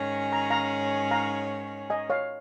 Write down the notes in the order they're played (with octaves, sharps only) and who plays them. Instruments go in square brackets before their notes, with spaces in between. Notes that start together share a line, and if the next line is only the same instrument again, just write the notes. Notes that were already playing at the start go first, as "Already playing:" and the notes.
Already playing: [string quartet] G#2 D#3 C#4 G#4 C#5
[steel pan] A#5
F5 A#5
F5 A#5
D#5 G#5
C#5 F5